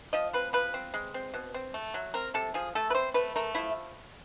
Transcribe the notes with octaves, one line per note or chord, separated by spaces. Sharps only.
F3 D#5
C4 B4
F3 B4
C4
G#3
C4
B2
C4
A3
F#3
C4 A#4
C3 A4
F3 G#4
A3 A4
B4
C4 C5
A3 B4
A3 A#4
F3 E4